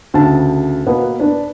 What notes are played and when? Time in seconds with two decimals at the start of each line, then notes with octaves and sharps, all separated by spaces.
0.14 D2 C#3 A5
0.86 B2 A#3 B3 B4
1.20 D4 B4